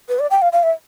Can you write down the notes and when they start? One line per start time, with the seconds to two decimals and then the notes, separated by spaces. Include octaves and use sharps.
0.09 B4
0.19 D5
0.31 G5
0.42 F5
0.53 F5
0.63 E5